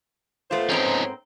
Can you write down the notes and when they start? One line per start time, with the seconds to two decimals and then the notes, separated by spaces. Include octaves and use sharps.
0.51 A#2 A3 B3 F4 C5
0.70 G#2 C4 C#4 D#4 A#5